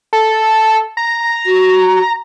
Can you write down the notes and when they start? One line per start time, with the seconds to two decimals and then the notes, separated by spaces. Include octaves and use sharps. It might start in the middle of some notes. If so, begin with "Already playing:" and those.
0.13 A4
0.97 A#5
1.46 F#4